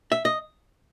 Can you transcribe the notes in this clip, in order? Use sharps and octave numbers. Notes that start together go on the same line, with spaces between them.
E5
D#5